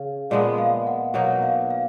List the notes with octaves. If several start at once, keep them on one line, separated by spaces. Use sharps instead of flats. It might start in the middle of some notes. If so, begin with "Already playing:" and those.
Already playing: C#3 F5
A#2 F3 G#3 B3 D#5
F5
F#5
B2 F#3 A#3 D#4 F#5
F5
F5